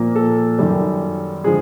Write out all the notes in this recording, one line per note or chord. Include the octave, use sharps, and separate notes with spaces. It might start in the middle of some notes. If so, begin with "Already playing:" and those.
Already playing: A#2 F3 A#3
A4
F#2 D#3 G3
D3 F3 G#3 G#4